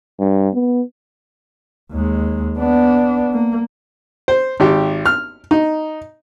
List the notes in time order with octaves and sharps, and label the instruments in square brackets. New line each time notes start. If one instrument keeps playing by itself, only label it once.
[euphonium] G2
B3
[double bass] D#2 G#3
B3 D4
A#3
[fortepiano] C5
G#1 G4
F6
D#4